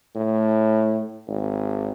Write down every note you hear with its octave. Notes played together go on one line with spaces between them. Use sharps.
A2
G#1